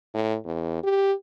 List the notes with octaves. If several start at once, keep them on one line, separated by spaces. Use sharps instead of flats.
A2
E2
G4